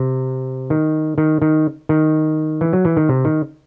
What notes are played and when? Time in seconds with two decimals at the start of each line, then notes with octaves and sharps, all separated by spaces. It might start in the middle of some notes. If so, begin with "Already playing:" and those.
Already playing: C3
0.70 D#3
1.18 D#3
1.42 D#3
1.89 D#3
2.61 E3
2.73 F#3
2.85 E3
2.97 D#3
3.09 C3
3.25 D#3